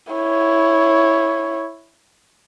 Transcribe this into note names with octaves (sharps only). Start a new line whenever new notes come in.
E4 C#5